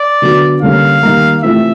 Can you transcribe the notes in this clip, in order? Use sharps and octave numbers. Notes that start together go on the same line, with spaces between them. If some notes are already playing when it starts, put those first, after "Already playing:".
Already playing: D5
D3 F#3 B3 D4
D3 G3 A#3 C#4 F5
D#3 G3 A#3
C3 E3 A3 C4 F4 E5